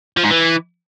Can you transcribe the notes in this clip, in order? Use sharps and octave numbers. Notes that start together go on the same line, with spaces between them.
F3
G#2
E3